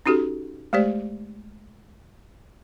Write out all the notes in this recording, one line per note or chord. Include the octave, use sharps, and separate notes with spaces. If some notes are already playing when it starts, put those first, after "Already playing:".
C#4 D#4 F#4 G4 A4
G#3 A3 G4 C5 D5